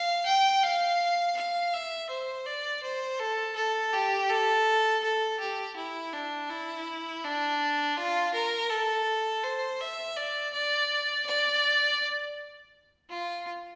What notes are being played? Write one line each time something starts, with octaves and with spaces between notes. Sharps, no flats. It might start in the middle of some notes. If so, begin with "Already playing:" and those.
Already playing: F5
G5
F5
F5
E5
C5
D5
C5
A4
A4
G4
A4
A4
G4
E4
D4
E4
D4
F4
A#4
A4
C5
E5
D5
D5
D5
F4